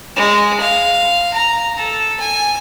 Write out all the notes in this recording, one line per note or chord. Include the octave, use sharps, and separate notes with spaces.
G#3
F5
A#5
A4
G#5